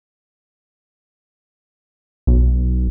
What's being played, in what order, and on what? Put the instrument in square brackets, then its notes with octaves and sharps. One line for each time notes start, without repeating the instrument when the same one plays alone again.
[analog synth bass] B1